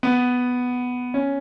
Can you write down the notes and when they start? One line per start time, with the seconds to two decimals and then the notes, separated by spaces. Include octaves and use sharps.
0.03 B3
1.14 C#4